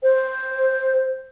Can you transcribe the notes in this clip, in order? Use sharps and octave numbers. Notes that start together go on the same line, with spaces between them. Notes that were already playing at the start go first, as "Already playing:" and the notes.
C5